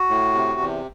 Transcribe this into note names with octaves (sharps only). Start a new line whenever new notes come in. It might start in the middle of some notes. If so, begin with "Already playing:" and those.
Already playing: F#4
A2
C3
E2